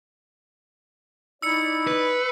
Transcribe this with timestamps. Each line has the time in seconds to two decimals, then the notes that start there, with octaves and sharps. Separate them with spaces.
1.42 D#4 E4 D5 E6 C#7
1.87 B4